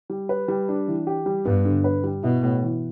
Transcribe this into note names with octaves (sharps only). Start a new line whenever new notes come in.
G3
B4
G3
D4
E3
G4
G3
G2 B3
D3
B4
G3
B2 E4
A2
E3